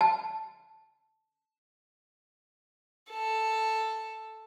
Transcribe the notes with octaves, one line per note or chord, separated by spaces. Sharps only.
A5
A4